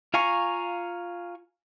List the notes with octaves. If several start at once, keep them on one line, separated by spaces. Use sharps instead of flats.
F4 F5 G#5 A#5 C#6